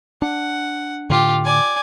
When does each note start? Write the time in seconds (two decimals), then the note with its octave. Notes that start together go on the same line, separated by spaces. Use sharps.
0.22 D4 F#5
1.10 A2 D3 F4 G4
1.45 D5 G#5